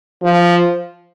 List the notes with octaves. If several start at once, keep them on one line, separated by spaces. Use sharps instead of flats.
F3